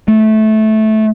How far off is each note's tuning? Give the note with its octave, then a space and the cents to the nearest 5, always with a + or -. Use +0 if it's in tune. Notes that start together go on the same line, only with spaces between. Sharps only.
A3 -15